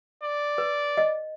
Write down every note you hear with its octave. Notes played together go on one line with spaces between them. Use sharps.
D5
B4
D#5